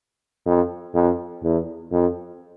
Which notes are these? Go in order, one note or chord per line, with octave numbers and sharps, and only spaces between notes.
F2
F2
E2
F2